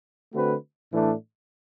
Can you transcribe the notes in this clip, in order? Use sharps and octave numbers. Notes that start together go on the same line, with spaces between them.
D3 A3 C4 F#4 B4
A2 E3 A3 D4